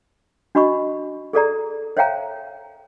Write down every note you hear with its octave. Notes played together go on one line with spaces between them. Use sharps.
D4 F#4 D#5 B5 C#6
G#4 A4 D5 A#5
C5 C#5 E5 F5 G5 A#5